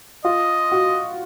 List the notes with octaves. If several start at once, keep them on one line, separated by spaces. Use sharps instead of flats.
F4 D#5
F#4